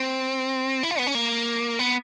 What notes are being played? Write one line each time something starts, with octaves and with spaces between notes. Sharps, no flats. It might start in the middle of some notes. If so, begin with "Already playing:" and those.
Already playing: C4
E4
F4
B3
C#4
A#3
B3